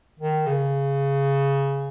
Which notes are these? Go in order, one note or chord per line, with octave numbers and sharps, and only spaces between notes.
D#3
C#3